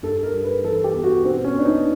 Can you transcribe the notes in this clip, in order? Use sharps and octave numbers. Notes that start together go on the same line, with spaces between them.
G2 A4
A#4
G3
B4
E3 A4
G4
B3
F#4
B2 C4
C#4
B3 D4
D#4